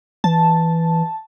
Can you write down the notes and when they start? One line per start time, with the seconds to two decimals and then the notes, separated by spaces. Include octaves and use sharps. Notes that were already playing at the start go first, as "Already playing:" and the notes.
0.24 E3 A5